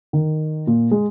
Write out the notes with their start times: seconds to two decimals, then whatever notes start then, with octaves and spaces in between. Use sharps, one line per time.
0.13 D#3
0.67 A#2
0.91 G#3